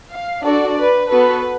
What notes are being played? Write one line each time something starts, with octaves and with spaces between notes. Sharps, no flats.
F5
D4 F#4 A4 D5
B4
B3 F#4 A4 B4